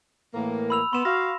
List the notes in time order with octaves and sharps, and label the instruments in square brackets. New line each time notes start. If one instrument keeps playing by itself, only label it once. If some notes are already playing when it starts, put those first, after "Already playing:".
[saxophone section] A2 E3 A#3
[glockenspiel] B5 E6 F7
[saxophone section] B3 [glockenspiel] C6 E7
[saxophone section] F#4 F5 [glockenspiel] A#6